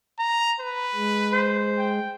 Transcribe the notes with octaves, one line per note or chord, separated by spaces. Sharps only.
A#5
B4
G#3
C5
G5